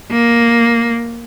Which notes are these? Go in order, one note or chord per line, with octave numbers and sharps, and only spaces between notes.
A#3